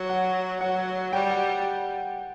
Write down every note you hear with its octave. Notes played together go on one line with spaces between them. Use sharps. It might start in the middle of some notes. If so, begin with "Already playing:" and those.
Already playing: F#3
F#5
F#3 F#5
G3 G5
F#5